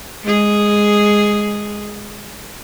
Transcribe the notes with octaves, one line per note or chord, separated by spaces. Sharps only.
G#3 G#4